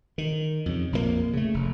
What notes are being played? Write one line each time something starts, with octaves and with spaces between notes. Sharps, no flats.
D#3
F2 C#3
A#1 F2 C#3 A#3
C#3 A3
F1